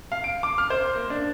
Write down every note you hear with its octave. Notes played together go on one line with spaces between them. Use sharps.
F5
D7
D6
F6
C5
A#3
D4